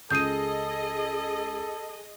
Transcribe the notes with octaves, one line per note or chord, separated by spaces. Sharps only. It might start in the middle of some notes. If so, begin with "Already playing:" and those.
C#2 G#4 A4 D#5 D#6 G6 C7 D#7